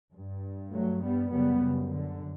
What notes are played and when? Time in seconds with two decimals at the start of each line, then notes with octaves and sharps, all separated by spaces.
0.13 G2
0.73 F#3 A3
1.03 G3 B3
1.33 F#2 C#3 G3 B3
1.62 C#3
1.93 D3